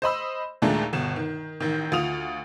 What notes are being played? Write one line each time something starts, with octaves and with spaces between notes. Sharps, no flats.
C5 D#5 B5 E6
D#2 A#2 G#3 A3 D4
G1 B2 E7
D#3
A1 D#3
D2 F4 D#6 F7